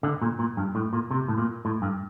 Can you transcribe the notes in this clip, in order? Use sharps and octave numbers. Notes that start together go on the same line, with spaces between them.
D3
A#2
A#2
G2
A2
A#2
C3
A2
A#2
A2
G2